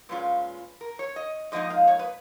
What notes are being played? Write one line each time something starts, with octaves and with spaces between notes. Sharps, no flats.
A#2 G#3 C#4 F4 B4
A#4
C#5
D#5
G#2 F3 A#3 D#4 D#5
F5
C#5
B4